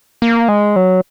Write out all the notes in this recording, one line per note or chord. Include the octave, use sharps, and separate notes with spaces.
A#3
G#3
F#3